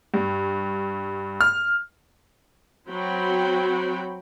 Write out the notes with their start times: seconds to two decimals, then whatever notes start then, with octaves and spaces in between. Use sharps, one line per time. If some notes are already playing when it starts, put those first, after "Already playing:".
0.14 G2
1.41 F6
2.87 F#3 C4 F#4 G5 B5